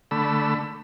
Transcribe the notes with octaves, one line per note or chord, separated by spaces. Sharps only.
D3 A3 B5 E6